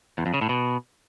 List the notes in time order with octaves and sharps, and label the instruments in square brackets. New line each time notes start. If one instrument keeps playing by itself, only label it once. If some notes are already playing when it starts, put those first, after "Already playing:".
[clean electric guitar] E2
F2
C#3
A2
B2